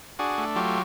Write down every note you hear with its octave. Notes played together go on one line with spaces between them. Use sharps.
D4 F#4 G#4
A3
F#3 F4 G4